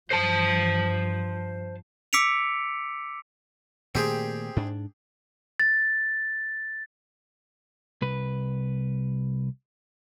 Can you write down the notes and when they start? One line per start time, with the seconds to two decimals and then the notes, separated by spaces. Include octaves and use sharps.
0.12 G2 F3 C5 A5
2.13 D6 E6 B6 C#7 D7 F7
3.95 A#2 D#3 A3 C4 G4 G#4
4.56 G#2 D4
5.60 A6
8.02 C2 B4